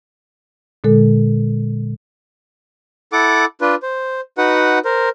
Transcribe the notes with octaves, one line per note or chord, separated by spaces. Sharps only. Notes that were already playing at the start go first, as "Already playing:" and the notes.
A#2 D3 G#3 A4
E4 A4 F#5 D6
D4 F4 B4
C5
D#4 F#4 B4 F#5
A#4 C5